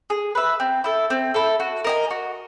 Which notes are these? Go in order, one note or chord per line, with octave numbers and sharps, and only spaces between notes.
G#4
B4 E5
C4
E4 A4
C4
E4 A4
F#4
A#4 D#5 G#5
F#4